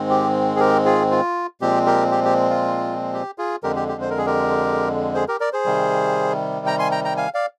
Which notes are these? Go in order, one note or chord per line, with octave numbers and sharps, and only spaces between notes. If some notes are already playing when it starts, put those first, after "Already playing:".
Already playing: G#2 D#3 G#3 C4
G4
G#4
G4 A#4
F4 G#4
F4
A#2 F3 G#3 C4 G4
G4 A#4
G4
G4
F4
G4
F4 G#4
F2 D3 G#3 G4 A#4
G4
G4
C5
A#4
G#4
G4 A#4
G#4 C5
G4 A#4
A#4 D5
G#4 C5
C3 D#3 G3
G5 A#5
G#5 C6
G5 A#5
G5 A#5
F5 G#5
D5 F5